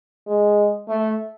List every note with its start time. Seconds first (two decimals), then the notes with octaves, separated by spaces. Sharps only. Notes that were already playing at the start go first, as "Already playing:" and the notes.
0.27 G#3
0.88 A3